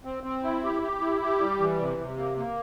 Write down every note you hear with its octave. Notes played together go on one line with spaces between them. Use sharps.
C4
C4
E4
G4
G4
E4
G4
G3
E3
C3
C3
A#3
A#3